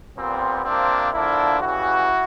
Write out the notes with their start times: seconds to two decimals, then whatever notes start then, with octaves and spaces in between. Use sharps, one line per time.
0.17 A#2 G3 B3 C4
0.65 C3 F3 A#3 C4 D4
1.13 D3 F3 A#3 D4 E4
1.61 C#3 E3 G3 E4 F#4